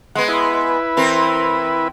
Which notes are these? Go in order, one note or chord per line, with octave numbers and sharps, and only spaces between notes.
G#3 B3 F#5
E4 B4
E3 C4 A#4